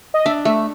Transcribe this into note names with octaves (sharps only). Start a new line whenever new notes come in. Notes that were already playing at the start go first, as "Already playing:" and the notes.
D#5
D4 E5
A3 E5